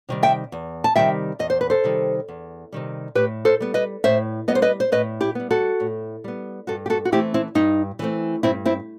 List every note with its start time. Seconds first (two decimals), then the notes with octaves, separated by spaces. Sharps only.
0.09 C3 D#3 G3
0.23 E5 G5
0.52 E2
0.84 A5
0.96 C3 D#3 G3 E5 G5
1.39 E2 D#5
1.50 C5
1.61 B4
1.70 A4 C5
1.84 C3 D#3 G3
2.28 E2
2.72 C3 D#3 G3
3.15 A2 G4 B4
3.45 A4 C5
3.60 G3 B3
3.74 B4 D#5
4.04 A2 C5 E5
4.48 G3 B3 D#5
4.55 C5
4.62 B4 D#5
4.80 C5
4.92 A2 B4 D#5
5.21 E4 G4
5.35 G3 B3
5.51 F#4 A4
5.80 A2
6.24 G3 B3
6.67 G2 F#4 A4
6.86 G4
6.90 F#4 A4
7.05 F#4
7.12 E3 A3 C4 E4 G4
7.34 C4 E4
7.55 G2 D#4
7.99 E3 A3 C4
8.43 G2 C4 E4
8.65 C4 E4